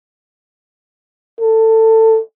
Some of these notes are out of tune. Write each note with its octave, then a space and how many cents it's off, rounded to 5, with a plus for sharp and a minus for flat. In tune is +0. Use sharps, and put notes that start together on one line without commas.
A4 +20